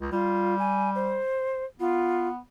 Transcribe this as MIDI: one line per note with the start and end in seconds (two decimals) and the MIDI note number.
0.01 0.12 37
0.12 1.18 55
0.12 0.58 65
0.59 0.90 80
0.95 1.64 72
1.80 2.38 59
1.80 2.28 65